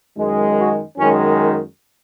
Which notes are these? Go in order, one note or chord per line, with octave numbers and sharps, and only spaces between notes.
F#2 D#3 G#3
F#4
F#2 D#3 G#3 C#4